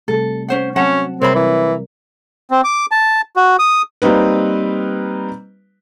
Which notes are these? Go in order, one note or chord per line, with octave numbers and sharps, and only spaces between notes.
C3 G3 A3 A4
C#4 C5 F#5
F#3 C4 C#4 F#5 A5
C3 G3 C4 A#4 C#5 E5 B5
E3
C4
D6
A5
F#4
D#6
G3 A#3 C4 D#4 B4